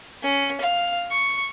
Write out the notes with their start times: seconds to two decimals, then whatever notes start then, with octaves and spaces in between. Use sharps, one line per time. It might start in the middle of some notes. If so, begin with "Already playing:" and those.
0.23 C#4
0.61 F5
1.11 C#6